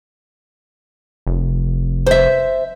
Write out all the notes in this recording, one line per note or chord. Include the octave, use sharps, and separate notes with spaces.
F1
C5 E5